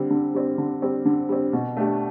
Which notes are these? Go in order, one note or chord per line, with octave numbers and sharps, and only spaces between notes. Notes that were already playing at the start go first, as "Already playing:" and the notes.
Already playing: D3 G3 C4
D3
G3 C4
D3
G3 C4
D3
G3 C4
B2
A3 D4 G4